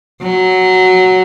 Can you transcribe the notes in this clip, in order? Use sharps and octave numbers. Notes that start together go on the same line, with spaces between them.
F#3